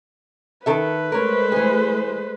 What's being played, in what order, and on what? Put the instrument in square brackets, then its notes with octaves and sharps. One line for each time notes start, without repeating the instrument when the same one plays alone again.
[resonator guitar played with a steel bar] D#3 A4 E5 [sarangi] B4
[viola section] G#3 A3 C5 [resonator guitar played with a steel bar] A#4 C#5
[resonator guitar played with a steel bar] E3 G#4